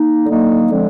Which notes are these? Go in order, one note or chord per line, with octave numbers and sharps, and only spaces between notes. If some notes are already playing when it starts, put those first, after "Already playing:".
Already playing: A#3 D#4
D3 F#3 A#3 D#4
D3 F3 G#3 C4